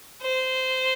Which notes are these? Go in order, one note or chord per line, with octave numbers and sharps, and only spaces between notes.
C5